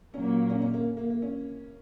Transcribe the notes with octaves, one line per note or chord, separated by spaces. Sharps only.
A#2 F#3 A#3 C#4
C#4
C#4
A#3
A#3
A#3
C#4